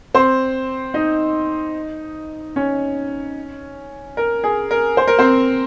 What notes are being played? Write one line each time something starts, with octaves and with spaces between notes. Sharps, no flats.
C4 C5
D#4 D#5
C#4 C#5
A#4
G#4
A#4
C5
A#4
C4 C5